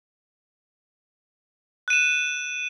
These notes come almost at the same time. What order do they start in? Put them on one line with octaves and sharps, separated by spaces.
F#6 D#7 E7